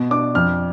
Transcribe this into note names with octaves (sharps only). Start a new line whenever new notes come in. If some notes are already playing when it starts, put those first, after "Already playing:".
Already playing: B2
D4 D6
F2 F6